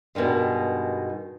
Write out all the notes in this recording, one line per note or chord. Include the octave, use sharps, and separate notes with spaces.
G2 B2 D3 D#3 G#3